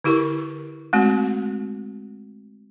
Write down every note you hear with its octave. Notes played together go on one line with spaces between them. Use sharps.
D3 E4 G4 A#4 C#6
G#3 A3 C4 F#4